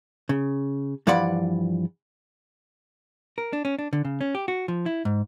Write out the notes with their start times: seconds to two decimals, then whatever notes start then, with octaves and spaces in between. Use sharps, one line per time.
0.29 C#3
1.07 G2 E3 F3 D5 F#5 B5
3.38 A#4
3.53 D4
3.65 C#4
3.79 D4
3.93 D3
4.05 C#3
4.21 C#4
4.35 G4
4.48 F#4
4.68 F3
4.86 E4
5.05 G#2